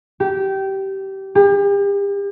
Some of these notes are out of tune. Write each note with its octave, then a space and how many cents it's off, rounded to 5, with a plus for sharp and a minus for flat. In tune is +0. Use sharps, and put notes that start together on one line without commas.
G4 -20
G4 +40